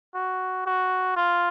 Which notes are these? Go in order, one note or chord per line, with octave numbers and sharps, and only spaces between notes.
F#4
F#4
F4